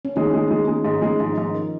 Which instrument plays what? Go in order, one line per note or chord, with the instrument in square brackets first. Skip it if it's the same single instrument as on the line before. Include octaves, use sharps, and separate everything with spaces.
[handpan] C#4
[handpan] D#3 D#4 [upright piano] G#3
[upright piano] G#3
G#3
G#3
[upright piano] G#2 [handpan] D#3 D#4
[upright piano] G#3
[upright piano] G#2 [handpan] F3 F4
[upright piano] G#2
[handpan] A#3 A#4